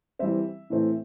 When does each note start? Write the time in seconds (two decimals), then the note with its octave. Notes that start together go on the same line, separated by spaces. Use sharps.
0.19 E3 G3 C4 E5
0.70 A2 E3 A3 C4